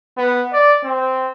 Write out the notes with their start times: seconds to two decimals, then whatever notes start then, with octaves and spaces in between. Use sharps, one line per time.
0.18 B3
0.53 D5
0.84 C4